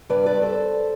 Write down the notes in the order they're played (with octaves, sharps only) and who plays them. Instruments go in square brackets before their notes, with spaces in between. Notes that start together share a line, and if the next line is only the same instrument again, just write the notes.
[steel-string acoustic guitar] G2 B4 D5
B4 D5
G2
A4 C5